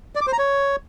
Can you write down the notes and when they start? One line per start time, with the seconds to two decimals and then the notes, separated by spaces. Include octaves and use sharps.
0.15 D5
0.21 D6
0.27 C5
0.33 A#5
0.38 C#5